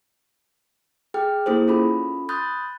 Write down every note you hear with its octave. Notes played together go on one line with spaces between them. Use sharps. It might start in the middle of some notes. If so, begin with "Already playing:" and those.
G#4 G5 F6
A#3 E4 G#4 A4 C5
C#4 F4 A4 B5
B5 C6 D#6 F#6 G6 A6